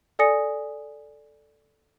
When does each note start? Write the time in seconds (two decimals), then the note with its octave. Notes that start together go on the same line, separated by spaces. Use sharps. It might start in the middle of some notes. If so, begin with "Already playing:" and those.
0.19 A4 D5 G#5 D#6 A#6 C#7